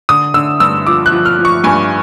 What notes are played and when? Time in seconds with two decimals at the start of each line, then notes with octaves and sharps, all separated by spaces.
0.09 D3 D#6
0.34 D3 E6
0.60 G2 E6
0.87 F3 D6
1.06 F#6
1.12 F3
1.26 F6
1.39 F3
1.45 C#6
1.64 G2 G#5